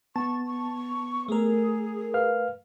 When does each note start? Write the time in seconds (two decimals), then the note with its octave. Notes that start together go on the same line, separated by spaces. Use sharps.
0.16 B3 A5 C#6
0.47 C#6
1.28 A3 G#4 A#4
2.14 B4 F5 F6